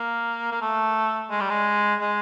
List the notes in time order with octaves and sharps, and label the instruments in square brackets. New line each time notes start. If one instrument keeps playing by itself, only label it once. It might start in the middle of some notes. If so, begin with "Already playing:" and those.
Already playing: [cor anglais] A#3
A#3
A3
G#3
G3
G#3
G#3